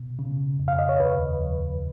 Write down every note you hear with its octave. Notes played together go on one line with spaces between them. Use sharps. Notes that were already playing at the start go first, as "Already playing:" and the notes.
Already playing: B2
C#3
F2
F5
D#5
C#5
D#2 B4
F3